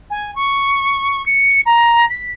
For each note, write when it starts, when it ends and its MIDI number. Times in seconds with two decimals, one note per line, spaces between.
0.10 0.33 80
0.35 1.24 85
1.26 1.61 97
1.66 2.06 82
2.10 2.31 95